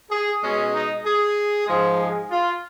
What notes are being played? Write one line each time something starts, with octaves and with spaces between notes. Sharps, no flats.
G#4
B2 G#3 C#4
D#4
G#4
G#2 F3 G#3
G#4
F4